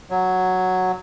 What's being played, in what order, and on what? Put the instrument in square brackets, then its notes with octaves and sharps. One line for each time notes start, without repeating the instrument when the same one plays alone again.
[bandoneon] F#3